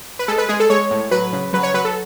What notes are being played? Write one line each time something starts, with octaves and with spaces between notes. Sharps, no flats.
B4
G#3 A4
B4
G#3 G#4
A4
G#3 C#5
A2
F#3 B4
C#3
F#3 B4
C#5
F#3 B4
A4